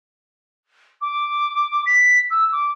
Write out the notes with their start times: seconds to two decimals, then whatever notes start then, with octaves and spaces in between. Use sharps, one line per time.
1.01 D6
1.86 B6
2.30 E6
2.52 D6